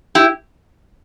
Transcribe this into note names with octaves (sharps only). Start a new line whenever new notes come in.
E4 G4